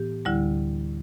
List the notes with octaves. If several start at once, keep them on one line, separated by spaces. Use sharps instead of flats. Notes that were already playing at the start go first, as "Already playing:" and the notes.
Already playing: A2 E3 B3 G4
D2 D3 G3 E4